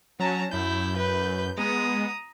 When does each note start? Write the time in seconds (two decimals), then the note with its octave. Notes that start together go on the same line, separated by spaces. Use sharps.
0.20 F#3 C#4 A5 A#5
0.51 F#2 E4 G6
0.97 B4
1.57 G#3 B3 A#5 D#6